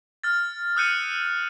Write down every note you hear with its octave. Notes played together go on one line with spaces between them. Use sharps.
F6 A6
D#6 E6 F#6 G6 C#7 D#7